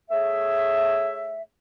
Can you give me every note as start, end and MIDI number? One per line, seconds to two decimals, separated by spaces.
0.10 1.42 57
0.10 1.42 68
0.10 1.42 73
0.10 1.42 76